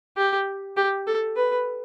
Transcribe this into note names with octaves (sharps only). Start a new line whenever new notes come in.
G4
G4
A4
B4